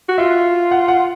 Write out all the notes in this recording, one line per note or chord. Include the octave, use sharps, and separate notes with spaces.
F#4
F4 E5
F#5
F#5